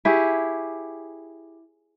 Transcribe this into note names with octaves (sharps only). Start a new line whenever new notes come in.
E4 G4 G#4 C#5